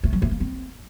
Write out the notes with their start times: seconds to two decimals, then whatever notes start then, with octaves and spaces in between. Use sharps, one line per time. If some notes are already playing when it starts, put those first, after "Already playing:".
0.03 A3
0.13 F#3
0.22 A3
0.31 A#3
0.40 C4